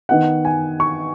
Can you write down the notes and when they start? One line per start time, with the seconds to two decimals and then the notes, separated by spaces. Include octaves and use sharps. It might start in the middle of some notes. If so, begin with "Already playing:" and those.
0.09 D#3 B3 D#4 F#5
0.45 G#5
0.80 C#6